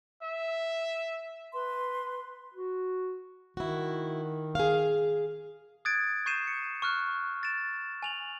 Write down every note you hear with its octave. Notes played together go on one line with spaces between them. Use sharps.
E5
B4 C6
F#4
D#3 E4 F#4
G#4 F5
D#6 F#6 G#6 A6 D7
C#6 G6 C7 D#7 E7
C#7
C#6 F6 F#6
A6 D7 E7
G#5 F7 F#7